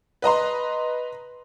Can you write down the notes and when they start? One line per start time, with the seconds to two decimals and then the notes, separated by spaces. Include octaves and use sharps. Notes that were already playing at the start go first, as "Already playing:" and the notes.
0.22 B4 D#5 A#5 C6